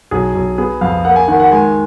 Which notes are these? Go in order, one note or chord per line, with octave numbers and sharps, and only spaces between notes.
B1 G#4
B1
B3 G#4
F2 F5
A#3 F#5
G#5
D#3 F#5
F#5
G#3 G#5